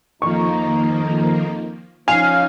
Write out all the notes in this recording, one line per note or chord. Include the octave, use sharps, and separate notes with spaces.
F2 D#3 F3 A#3 D#4 A#5 C#6
F3 C#4 D#4 F5 G#5